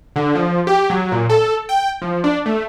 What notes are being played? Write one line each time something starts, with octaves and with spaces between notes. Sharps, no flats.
D3
F3
G4
F#3
A#2
A4
G5
F3
D4
A3